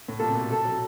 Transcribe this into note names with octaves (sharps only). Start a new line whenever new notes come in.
A2
A#2 A4
C3
B2
C3 A4
F#3